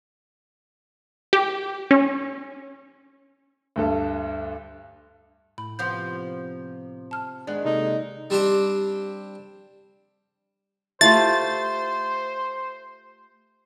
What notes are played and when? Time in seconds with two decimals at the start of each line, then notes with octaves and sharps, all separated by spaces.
1.33 G4
1.91 C#4
3.76 D2 G2 A4
5.58 A2 B5
5.79 C3 F3 B3 C6 G6
7.11 A5 F6
7.47 D#3 G#3 B3 D4 G#4 D5 F#6
7.65 C3 A#3 D#4 A4
8.30 G3 C4 D4 G4 C5
11.01 A3 F4 G4 C5 A6